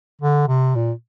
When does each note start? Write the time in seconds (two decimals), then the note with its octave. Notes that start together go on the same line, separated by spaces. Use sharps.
0.21 D3
0.48 C3
0.75 A#2